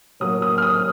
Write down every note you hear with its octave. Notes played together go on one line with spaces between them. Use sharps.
A2 F#3 A#3 D#6
D#6
F6
D#6